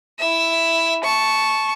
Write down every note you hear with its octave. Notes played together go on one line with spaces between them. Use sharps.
E4 E5
A5 C#6